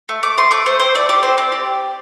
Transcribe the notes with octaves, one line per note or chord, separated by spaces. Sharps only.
A3
A3 D6
A3 C6
A3 D6
A3 C5
C4 C5
A3 D5
G4 D5
C4 C5
C4 D5
G4